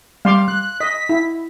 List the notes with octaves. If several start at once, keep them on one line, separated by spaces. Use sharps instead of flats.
G3 F5 C6 D6
F#6
D#5 B6
E4